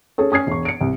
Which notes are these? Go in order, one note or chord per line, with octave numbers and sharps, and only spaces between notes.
C#4 G#4 A4 C#5
C#4 D#6 G#6 C7
E1 C#6
C#7 D7
C2